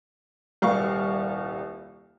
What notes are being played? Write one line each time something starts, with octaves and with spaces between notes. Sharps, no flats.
D#1 C2 F5 C#6